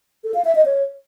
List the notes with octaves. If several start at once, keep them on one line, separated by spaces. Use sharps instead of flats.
A4
F5
E5
D#5
C#5